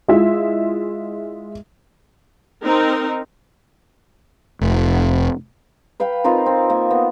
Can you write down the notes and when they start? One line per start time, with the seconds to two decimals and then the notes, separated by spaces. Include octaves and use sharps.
0.08 G#3 E4 F4 E5
2.64 C4 D#4 A#4
4.61 F1
6.00 B4 F5 G5 B5
6.24 C4 D#4 F4 A#4
6.46 C4
6.70 A#3
6.91 B3